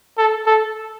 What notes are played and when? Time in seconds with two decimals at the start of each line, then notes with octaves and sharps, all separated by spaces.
0.18 A4
0.47 A4